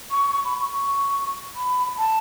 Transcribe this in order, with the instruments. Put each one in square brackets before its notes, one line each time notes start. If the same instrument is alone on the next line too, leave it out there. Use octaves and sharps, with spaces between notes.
[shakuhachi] C#6
C#6
B5
C#6
B5
A5